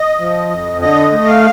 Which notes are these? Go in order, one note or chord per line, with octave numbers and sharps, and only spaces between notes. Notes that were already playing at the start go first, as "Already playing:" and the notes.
Already playing: D#5
F3
F2
D3 D#5
A3
F5